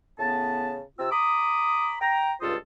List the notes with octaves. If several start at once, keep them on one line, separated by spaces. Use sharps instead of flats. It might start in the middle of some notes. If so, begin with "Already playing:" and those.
A2 C#3 B3 A5
C3 C4 F4 E6
A#5 B5 D6 D#6
G5 A#5
C#2 G2 F4 A4 C5 D#6